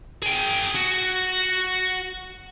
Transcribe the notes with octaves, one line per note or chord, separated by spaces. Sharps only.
G#4 G5
F#4